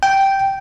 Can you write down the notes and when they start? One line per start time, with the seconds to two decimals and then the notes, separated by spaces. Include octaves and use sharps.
0.03 G5